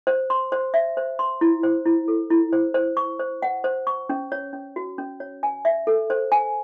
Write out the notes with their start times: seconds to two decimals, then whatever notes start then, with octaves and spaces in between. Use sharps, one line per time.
0.07 C5
0.30 C6
0.52 C5
0.74 E5
0.97 C5
1.19 C6
1.41 E4
1.63 C5
1.86 E4
2.08 A4
2.30 E4
2.53 C5
2.74 C5
2.97 C#6
3.19 C5
3.42 F#5
3.64 C5
3.87 C#6
4.09 C#4
4.32 C#5
4.53 C#4
4.76 F#4
4.98 C#4
5.20 C#5
5.43 G#5
5.65 E5
5.87 A4
6.10 C5
6.32 G#5